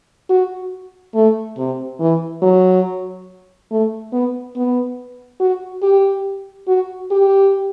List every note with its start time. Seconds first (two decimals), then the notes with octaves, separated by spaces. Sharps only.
0.30 F#4
1.15 A3
1.58 C3
2.00 E3
2.42 F#3
3.71 A3
4.12 B3
4.56 B3
5.40 F#4
5.83 G4
6.68 F#4
7.11 G4